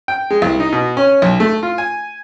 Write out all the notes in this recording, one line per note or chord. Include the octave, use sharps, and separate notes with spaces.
G5
G#3
C2
D#4
B2
C#4
B1
A3
F4
G#5